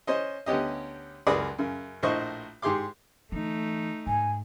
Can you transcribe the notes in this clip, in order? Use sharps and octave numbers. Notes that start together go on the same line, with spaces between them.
C#4 C5 D#5
D2 B3 C#4 G4 D#5
C#2 F#2 G#4 B4 D5 D#6
F#2 C#3
A#1 A2 C5 D#5 C#6
G#2 G4 G#4 C6 D6
D3 E3 A3 D#4
G#2 G#5